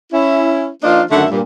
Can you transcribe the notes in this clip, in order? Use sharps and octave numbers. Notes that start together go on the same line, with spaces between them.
C#4 E4
F3 A#3 D4 D#4 F4
F#2 D3 D#3 A3 E5 F#5
G2 A#2